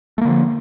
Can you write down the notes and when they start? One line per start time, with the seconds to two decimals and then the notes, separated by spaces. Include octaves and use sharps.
0.18 A3
0.21 A#3
0.25 D3
0.29 F3